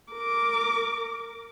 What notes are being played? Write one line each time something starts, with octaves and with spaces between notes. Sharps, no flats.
A#4 D6